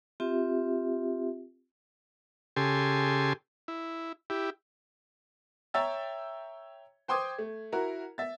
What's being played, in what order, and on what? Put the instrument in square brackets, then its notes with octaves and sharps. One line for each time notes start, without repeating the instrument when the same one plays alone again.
[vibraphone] C4 F4 G4 E5
[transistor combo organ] C#3 G4 A4 G#5 C6
E4
E4 G4
[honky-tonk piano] C#5 E5 G5 A#5 E6 A6
C5 G5 C6 D6 D#6 G#6
A3
E4 F#4 A#4 A#5
E5 A6